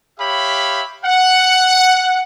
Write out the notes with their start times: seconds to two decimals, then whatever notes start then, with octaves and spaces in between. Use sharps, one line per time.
0.19 G4 C#5 E5 F5 B5
1.04 F#5